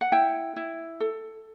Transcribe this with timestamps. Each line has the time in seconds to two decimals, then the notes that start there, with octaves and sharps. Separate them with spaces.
0.01 F#5
0.12 E4 G5
0.56 E4
1.00 A4